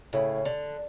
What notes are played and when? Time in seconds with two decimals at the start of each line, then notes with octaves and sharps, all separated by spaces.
0.13 A2 C#3
0.45 D3